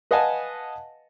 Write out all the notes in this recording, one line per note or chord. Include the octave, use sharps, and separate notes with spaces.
B4 D#5 F5 F#5 G#5 A5